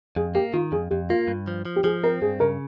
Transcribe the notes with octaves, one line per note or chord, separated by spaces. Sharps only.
F2 G#4
A#3 G4
D#3 F4
F2 G#4
F2 G4
A#3 F4
G2
F3
F3
G4
F3 G#4
C4 A#4
G2 G#4
C#3 A#4